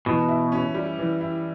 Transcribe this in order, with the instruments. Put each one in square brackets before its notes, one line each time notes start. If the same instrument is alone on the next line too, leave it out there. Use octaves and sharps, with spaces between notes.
[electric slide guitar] B2 [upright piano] E3
[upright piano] E4
C#4
G3
E3
E4